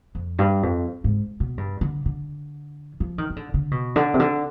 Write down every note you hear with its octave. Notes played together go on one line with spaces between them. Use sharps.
F2
G2
F2
G#2
B2
G2
D3
D3
F3
D#3
D#3
D3
D3
B2
D3
C3
D3